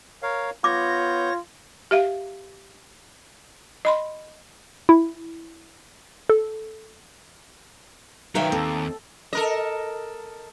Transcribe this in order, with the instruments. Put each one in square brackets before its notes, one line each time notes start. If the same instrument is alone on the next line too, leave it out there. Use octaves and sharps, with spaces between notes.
[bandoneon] A#4 C#5 F5
[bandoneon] B3 G6 [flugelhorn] F4 [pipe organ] C#5 A#6 [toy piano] D6
[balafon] G4 E5 F5
D#5 B5 C6
[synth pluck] E4
A4
[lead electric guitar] D#3 F#3 [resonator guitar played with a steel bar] D#4 F5 G5 [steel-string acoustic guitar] A#4 C#5 E5
[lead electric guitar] D#2 [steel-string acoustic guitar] C4 [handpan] A4
[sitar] A4 A#4 D#5